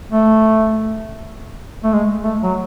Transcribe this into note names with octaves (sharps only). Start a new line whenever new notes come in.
A3
A3
G#3
A3
F#3